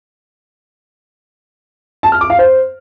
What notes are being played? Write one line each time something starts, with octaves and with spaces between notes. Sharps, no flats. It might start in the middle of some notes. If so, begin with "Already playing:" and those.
A5
F6
D6
F5
C5